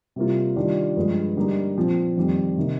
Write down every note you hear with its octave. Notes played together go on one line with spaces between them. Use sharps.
C3 G3 A#3 F4
D#3 G3 D4 F4
G2 F3 G#3
D3 G3 A#3 D#4
A#2 F3 C4
F2 D#3 G3 C4
C3 D#3 A#3